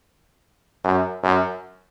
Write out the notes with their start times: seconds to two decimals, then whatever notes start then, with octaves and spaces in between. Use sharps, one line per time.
0.84 F#2
1.23 F#2